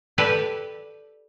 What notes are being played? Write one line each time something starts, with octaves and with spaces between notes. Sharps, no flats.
G4 A4 B4 D5